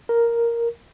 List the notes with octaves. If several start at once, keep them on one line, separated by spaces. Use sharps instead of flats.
A#4